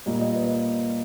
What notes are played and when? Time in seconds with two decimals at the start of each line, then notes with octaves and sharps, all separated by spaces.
0.06 A#2 G3 A#3 D#5
0.20 D#5
0.35 B4